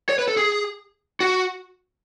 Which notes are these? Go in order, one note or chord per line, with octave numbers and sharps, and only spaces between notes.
C#5
B4
A4
G#4
F#4